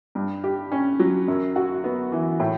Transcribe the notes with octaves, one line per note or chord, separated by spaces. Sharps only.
G2
G4
C#4
F#3
F#2
F#4
B3
E3
A2